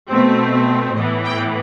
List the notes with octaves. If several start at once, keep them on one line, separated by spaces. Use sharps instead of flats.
B2 A3 C4
A2 E3 B3 D#5
G5